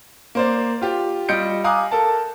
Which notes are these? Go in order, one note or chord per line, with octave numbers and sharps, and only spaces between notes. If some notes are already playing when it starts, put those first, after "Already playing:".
A#3 C5 D5
F4 G4
G3 F4 D#5 G6 C#7 D7
F5 G#5 A#5 D6 D#6 F#6
A4 A#4 A5